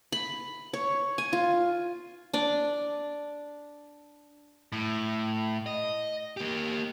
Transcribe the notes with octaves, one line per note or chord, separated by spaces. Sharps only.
B5
C#5
G#5
F4
D4 D5
A2
D#5
A#3 G4